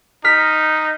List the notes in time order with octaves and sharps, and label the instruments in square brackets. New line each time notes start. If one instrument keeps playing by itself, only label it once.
[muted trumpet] D#4 [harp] F6 B6